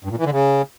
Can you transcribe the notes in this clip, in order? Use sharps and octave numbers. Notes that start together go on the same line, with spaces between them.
G2
A#2
E3
D3
C#3